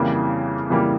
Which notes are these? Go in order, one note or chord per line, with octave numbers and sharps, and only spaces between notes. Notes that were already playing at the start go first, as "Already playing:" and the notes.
Already playing: F2 C#3 E3 G3 A#3
F2 C#3 E3 G3 A#3